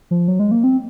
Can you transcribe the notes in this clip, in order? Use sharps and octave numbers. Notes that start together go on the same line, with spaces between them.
F3
F#3
G#3
A#3
C4